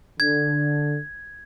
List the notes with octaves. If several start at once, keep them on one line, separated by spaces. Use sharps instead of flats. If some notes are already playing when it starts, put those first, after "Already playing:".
D3 G#6